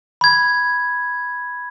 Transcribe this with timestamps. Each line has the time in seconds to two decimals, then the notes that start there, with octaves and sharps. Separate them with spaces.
0.21 B5 G#6